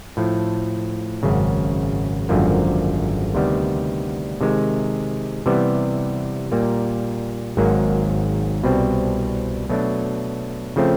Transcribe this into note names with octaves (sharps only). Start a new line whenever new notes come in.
A2 F3 A3
G#1 F#2 C#3
G#1 F#2 D3 F3 A#3
D2 C3 D#3 G3 B3
C3 D#3 G#3
C3 E3 G3 B3
A#2 G3 A#3
G#1 G#2 D#3 F#3 A#3
C2 B2 G3 C4
B2 F#3 A3 D4
C#3 F3 A3 C4